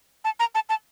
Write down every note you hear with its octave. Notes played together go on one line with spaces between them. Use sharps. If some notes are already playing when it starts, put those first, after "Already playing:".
A5
A#5
A5
A5